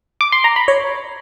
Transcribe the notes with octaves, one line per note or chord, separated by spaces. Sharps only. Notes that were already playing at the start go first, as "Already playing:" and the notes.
D6
C6
A#5
B5
C#5